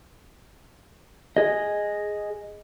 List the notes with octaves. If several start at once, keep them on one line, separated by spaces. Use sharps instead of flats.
G#4 D#5